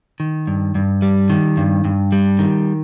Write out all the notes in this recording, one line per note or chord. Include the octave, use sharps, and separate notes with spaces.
D#3
G2
G2
G3
D#3
G2
G2
G3
D#3